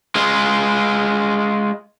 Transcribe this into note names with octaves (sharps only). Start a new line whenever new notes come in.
G#3 F4